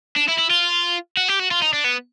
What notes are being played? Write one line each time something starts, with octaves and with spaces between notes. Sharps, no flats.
D4
E4
E4
F4
F#4
G4
F#4
F4
D#4
D4
B3